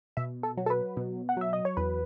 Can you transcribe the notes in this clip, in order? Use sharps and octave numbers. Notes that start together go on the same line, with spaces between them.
B2 E5
A4
F#3
A4
B4
B2
F#5
F#3 E5
D#5
C#5
E2 B4